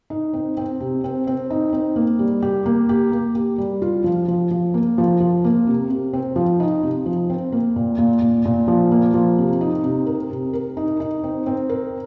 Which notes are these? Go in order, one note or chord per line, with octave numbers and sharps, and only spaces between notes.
D#4
C4
C4
C3
C4
C4
D#4
C4
A#3
G3
G4
A#3
G4
A#3
G4
G3
F4
F3
F3
F3
A#3
F3
F3
A#3
C3
C3
C4
F3
D#4
C3
F3
C4
A#3
A#2
A#2
A#2
A#2
F3
A#3
F3
C3
D#4
C3
A#4
C3
A#4
D#4
D#4
C4
C4
A#4